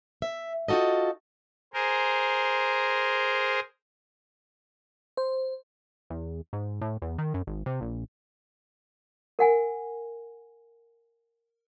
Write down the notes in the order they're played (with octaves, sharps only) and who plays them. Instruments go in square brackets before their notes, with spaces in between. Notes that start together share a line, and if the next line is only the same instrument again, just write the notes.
[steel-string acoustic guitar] E5
D#4 F4 F#4 A4 D#5
[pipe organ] G#4 A#4 C5
[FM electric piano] C5
[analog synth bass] E2
G#2
A2
E2
D#3
F#2
G#1
C3
A#1
[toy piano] A#4 F#5 G#5